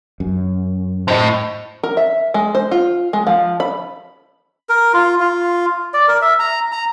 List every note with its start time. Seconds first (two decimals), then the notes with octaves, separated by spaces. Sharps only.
0.20 F#2
1.08 A2 C5 D#5
1.83 A#4
1.97 E5
2.34 G#3
2.55 C5
2.71 F4
3.13 G#3
3.27 F3
3.60 B5
4.69 A#4
4.94 F4
5.20 F4
5.94 D5
6.08 A#4
6.22 E5
6.39 A#5
6.72 A#5